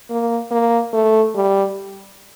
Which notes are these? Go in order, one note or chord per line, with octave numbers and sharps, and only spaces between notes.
A#3
A#3
A3
G3